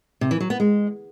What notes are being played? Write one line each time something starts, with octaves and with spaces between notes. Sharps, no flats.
C3
E3
F#3
B3
G#3